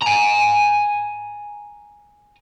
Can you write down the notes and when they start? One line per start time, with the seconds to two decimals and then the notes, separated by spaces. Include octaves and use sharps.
0.02 G#5 A#5